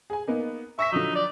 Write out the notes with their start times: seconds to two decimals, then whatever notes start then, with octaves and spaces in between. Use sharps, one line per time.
0.10 G#4 G#5
0.28 A#3 B3 D#4
0.79 E5 C#6 A#6 B6
0.92 D3 F3 F#3 D#4
1.15 D5